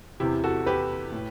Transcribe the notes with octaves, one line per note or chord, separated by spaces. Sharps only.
E2 C3 E3 E4 G4
F#4 A4
G4 B4
A2